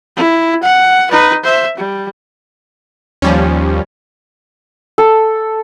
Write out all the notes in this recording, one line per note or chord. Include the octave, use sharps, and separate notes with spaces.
E4
F#5
D#4 B4
C5 E5
G3
D#2 F3 G3 C#4
A4